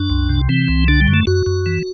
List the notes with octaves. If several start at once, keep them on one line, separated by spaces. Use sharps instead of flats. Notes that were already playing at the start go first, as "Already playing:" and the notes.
Already playing: F#2 D4
C2
C3
E3 C4
C2
D3 D4
G3
F#2
A3
F#2 F#4
F#2
E3